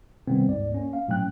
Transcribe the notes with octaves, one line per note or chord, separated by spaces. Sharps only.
C3 D#3 G3 B3 C4
D2 G#2 D5
A#3 C#4
F5
A2 F#3 A3 C#4 G5 F#6